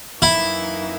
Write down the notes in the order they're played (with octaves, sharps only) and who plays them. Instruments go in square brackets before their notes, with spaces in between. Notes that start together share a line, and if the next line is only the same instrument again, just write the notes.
[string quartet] F#2 E3 A#3 D#4 [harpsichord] E4